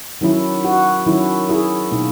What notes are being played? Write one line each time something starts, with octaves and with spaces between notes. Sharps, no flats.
D#3 F#3 C#4 E4
F#4
D#3 F#3 C#4 E4
E4 G#4
B2 A#3 D#4